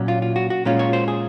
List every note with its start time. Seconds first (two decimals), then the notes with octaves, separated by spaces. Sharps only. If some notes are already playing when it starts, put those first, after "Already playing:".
Already playing: A#2 F#3 C#4
0.08 F4
0.22 F4
0.36 F#4
0.50 F#4
0.65 A#2 G#3 C#4 F4
0.79 C#5
0.93 C5
1.08 G#4